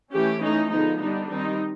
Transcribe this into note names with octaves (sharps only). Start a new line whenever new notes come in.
E3 A3 C#4 G4
E3 A3 C#4 D#4
D3 F3 G#3 B3 D#4
D3 G3 B3 D4 D#4
D#3 G3 C4 D#4